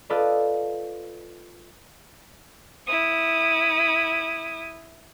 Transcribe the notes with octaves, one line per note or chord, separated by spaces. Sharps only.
F4 A4 B4 D5 D#5
E4 D#6